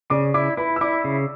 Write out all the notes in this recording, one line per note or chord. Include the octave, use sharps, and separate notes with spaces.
C#3 D5 D6
E4 D5 D6
E4 B4 B5
E6
E4 D5 D6
C#3